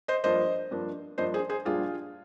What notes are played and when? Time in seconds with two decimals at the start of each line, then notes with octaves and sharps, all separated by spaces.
0.08 C5 D#5
0.24 G2 F3 A#3 D4 C5 D#5
0.71 G2 F3 A#3 D4
1.18 G2 F3 A#3 D4 C5 D#5
1.34 G#4 C5
1.49 G#4 C5
1.65 A#1 A#2 G3 D4 F4 G#4